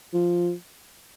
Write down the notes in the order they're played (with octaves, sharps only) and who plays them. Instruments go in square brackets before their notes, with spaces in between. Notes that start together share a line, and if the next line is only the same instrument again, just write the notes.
[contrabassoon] F3